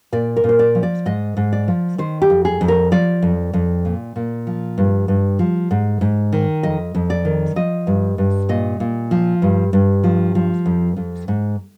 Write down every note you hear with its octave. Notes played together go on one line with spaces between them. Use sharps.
A#2 D5
A#4
A#2
C5
D5
F3
D5
G#2 D#5
G#2
D5
F3
D#3 C5
G4
F2
G#4
F2
A#4
F3 D5
F2
F2
A#2
A#2
F3
G2
G2
F3
G#2
G#2
D#3
F2 D#5
F2
D5
D#3
F3 D#5
G2
G2
A#2 D#5
A#2
F3
G2
G2
F3
F3
F2
F2
G#2